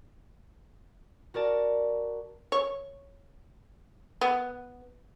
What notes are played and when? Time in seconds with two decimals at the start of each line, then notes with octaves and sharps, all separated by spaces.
1.34 F#4 A#4 D5 A5
2.52 C#5
4.21 B3